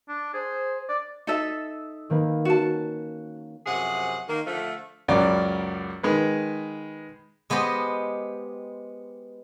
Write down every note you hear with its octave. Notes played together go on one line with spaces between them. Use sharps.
D4
G#4 C5
D5
D#4 A4 E5
D#3 A#3 B4
C#4 F#4 A5
F#2 C3 F3 G#4 F#5
D#3 A#3
D3 F3 A3
C#2 F#2 C#3 F#3 D5
D#3 G#3 B4
G#3 B3 G4 C5 D#5